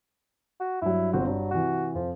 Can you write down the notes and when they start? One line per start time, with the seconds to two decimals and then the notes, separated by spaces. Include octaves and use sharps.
0.60 F#4
0.82 G2 F#3 E4
1.13 G1 C4 F#4
1.26 G2 F#3
1.51 C3 E3 F#4
1.95 F2 F3